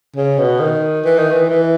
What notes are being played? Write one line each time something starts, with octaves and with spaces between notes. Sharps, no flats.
C#3
B2
D#3
E3
D#3
E3
E3